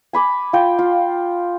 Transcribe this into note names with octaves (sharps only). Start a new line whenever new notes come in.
G#5 B5 D6
F4 G5
F4